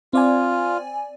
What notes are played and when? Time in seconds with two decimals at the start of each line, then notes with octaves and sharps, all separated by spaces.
0.13 C4 F4 D5 G#5